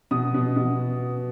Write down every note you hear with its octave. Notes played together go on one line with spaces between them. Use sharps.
B2 D#6
B2
B2